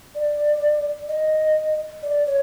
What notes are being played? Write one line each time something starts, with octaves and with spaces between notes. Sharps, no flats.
D5
D#5
D5
C#5